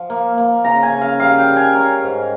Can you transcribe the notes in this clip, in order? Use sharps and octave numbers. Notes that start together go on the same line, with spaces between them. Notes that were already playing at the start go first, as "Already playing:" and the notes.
Already playing: F3
A#3
A#3
C#3 A#5
G#5
C#3
F5
G3 F5
G5
G3
G#5
C#4 A#5
G#2